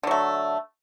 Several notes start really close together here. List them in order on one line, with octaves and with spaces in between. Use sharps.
D3 F#3 A3